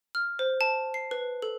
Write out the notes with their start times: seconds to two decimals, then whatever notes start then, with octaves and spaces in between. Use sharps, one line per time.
0.15 F6
0.39 C5
0.61 A5
0.94 C7
1.11 B4
1.42 A4